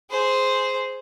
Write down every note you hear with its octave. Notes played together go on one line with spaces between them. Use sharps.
G#4 C5